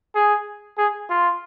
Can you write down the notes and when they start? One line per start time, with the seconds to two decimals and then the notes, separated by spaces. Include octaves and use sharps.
0.15 G#4
0.78 G#4
1.10 F4